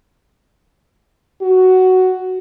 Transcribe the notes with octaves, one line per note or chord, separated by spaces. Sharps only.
F#4